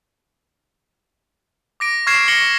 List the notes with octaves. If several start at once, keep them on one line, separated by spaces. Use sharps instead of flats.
D6 A#6 D7
C#6 F6 G#6 C7 E7
C#6 A#6 C#7 F#7 G7